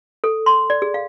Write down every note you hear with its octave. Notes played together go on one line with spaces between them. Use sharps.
A4
C6
D5
G#4
F5